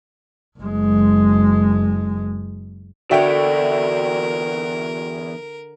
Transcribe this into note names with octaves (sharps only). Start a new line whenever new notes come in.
F#1 G#3
E2 D3 F#4 A#4 C#5 D5 E5 G5